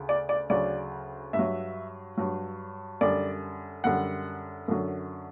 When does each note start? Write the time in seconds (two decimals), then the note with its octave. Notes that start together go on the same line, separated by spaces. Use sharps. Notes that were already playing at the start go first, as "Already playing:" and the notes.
Already playing: D2 C#3
0.09 D5
0.29 D5
0.50 D2 C#3 F#3 D5
1.33 G2 E5
1.39 F#3
2.17 G2 F#3
3.01 F#2 D3 G3 D5
3.84 F#2 D3 G3 F#5
4.68 F#2 D3 F#3